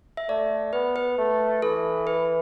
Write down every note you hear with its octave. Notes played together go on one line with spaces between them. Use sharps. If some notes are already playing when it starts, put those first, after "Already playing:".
E5
A3 D5
B3 B4
B4
A3
E3 A4
B4